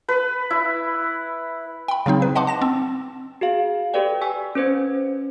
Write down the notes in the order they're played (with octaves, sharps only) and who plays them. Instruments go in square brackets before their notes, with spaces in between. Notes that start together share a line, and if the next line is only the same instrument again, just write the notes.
[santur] B4
E4
[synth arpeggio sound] G5 B5
C#3 F#3 C4 D#4
B4
D#5 F#5 A5 C6 D6
A5 A#6 E7
C4
[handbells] F#4 G#4 F5
G4 A4 B4 D5 G5
G#5 C#6 E6 B6
C#4 B4 C5 G#6